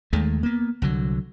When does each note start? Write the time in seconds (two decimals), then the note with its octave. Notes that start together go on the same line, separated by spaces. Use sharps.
0.13 D#2 D#3 G#3 A3
0.43 A#3 B3
0.82 C2 D3 F#3